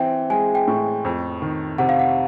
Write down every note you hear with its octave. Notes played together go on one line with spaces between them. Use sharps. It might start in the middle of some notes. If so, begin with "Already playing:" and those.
Already playing: E3 C4 E5 G5
G#3 G#5
G5
A2
F2
D#3
C3 F#5
F5
F#5